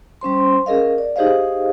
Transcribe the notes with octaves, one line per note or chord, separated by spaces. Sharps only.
G3 C#4 C5 C6
C#4 G#4 A#4 D#5 F5
D5
D#4 G4 G#4 C5 D#5 F5